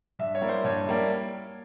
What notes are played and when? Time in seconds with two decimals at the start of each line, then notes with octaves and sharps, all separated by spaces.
0.19 G2 E5
0.35 C#5
0.41 G3 A#3 E4
0.49 C5
0.64 G2 C#5
0.86 G3 A#3 E4